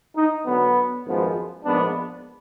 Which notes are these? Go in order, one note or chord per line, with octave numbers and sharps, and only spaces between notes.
D#4
D2 D3 F#3 B3
G#1 F#2 F3 G#3 B3
A#1 G#2 F3 B3 D4